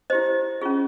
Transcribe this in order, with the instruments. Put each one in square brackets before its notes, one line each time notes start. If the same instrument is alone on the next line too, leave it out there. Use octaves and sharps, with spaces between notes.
[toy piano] E4 G4 C5 D#5
C#4 F4 G#4